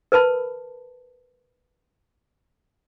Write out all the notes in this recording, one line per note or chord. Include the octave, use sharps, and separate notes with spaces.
A#4 B4 A5 B5